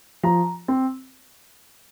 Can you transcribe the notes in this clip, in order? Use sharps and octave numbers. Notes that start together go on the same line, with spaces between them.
F3 A#5
C4